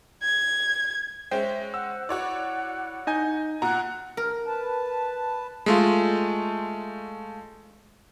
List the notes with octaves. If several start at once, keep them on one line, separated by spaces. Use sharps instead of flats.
G#6
G#3 C#4 C5 E5 G5
F#5 E6
E4 F#4 C#5 D5 F#5
D#4 D#5 G#5 G6
A#2 F#5 A#5
A#4
B4 A5
G#3 A3 F4